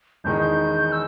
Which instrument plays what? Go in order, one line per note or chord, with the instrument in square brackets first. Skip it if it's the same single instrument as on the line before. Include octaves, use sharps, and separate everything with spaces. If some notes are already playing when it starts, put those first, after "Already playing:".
[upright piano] E1 E2 D#3 G#3 D#4 [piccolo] G6
[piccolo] G6
E6